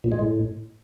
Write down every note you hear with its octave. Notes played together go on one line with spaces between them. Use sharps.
A#2
G#3
A2